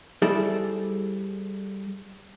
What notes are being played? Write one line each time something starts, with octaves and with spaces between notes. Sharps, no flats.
G3 E4 G#4 A4 C5 D5